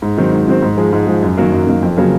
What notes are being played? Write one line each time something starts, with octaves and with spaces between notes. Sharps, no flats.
G#2
D#3 F#3 C4
G#2
D#3 F#3 C4
G#2
F3 G#3
G#2
F3 G#3
F#2
D#3 F#3 A#3
F#2
D#3 F#3 A#3
F2
C#3 F#3 A#3